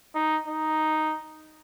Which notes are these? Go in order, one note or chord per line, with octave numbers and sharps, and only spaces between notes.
D#4
D#4